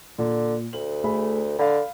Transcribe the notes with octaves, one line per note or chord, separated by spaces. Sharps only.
A#2 D3
D2 F#7
A3 G#4 B5
D3 F5 B5